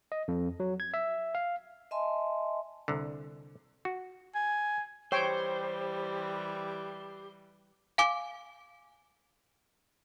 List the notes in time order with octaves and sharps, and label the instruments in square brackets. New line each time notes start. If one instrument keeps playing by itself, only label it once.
[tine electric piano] D#5
F2
F#3
G#6
E5
F5
[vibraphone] D#5 E5 G#5 A5 C6
[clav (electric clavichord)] C2 D3
F#4
[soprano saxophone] G#5
[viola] E3 G3 [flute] G4 [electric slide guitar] C5 [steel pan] C#5 G5
[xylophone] F5 G#5 D6